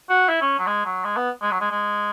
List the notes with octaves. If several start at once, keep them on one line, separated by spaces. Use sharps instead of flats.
F#4
E4
C#4
F#3
G#3
F#3
G#3
B3
G#3
F#3
G#3
G#3